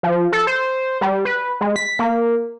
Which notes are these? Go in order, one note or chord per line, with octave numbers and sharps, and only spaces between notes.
F3
A4
C5
G3
B4
G#3
B6
A#3